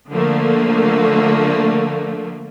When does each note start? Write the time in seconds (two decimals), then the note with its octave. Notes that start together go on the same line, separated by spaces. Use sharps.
0.10 D3 F3 A3 A#3